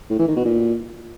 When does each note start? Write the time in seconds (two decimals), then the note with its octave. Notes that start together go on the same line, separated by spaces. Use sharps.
0.10 A2
0.19 E3
0.28 D#3
0.36 B2
0.45 A#2